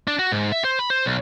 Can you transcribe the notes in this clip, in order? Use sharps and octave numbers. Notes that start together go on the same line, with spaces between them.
D4
F#4
G#2
E5
C5
B5
C5
B1